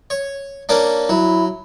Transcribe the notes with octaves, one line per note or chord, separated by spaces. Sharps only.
C#5
A#3 C#4 D4
F#3 E4